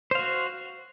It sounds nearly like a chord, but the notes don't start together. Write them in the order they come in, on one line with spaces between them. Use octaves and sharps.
C5 F5 F#4